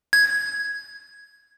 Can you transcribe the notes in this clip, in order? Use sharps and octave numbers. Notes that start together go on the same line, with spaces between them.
G#6